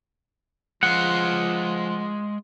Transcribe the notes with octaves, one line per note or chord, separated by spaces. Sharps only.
F3 G#3 F4 F#5